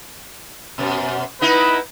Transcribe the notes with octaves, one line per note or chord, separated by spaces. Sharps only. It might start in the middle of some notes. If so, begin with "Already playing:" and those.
F#2 B2
B3 D#4 E4 B4